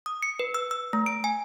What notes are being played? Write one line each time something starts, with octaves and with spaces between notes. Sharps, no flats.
D#6
C#7
B4
E6
E6
A3
D7
G#5